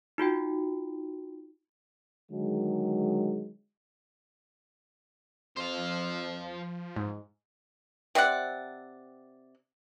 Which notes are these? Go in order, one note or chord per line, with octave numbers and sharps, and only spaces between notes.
D#4 F4 F#4 G5
D3 D#3 F#3 G#3
F2 F3 C5 F5
G#2
C3 C4 D5 F#5